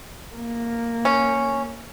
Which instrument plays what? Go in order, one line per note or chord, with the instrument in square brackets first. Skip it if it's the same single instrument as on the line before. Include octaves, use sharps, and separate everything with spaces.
[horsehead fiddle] A#3
[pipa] C#4